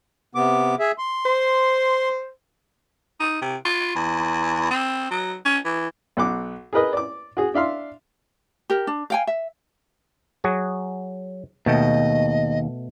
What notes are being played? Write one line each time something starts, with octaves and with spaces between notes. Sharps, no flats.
C3 B3 D6
G#4 E5
C6
C5
D#4
C3
F4
E2
C4
F#3
C#4
E3
B1 F#5 D6
G#4 A#4 B4 D#5
D5 D6
F#4 G#4
D4 E5 F5 C6
G4 A#4
D4
F5 G5 G#5
E5
F#3 F#4 G#4
D#2 B2 A3 D#5 G5